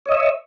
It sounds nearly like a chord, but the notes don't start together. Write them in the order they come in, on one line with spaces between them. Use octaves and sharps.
C#5 D#5 E5